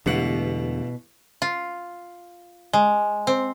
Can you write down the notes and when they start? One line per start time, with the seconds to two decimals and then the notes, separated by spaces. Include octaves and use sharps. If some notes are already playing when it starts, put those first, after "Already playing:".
0.06 A1 E2 G2 B2 D3 G#3 F#5
1.42 F4
2.73 G#3
3.27 C4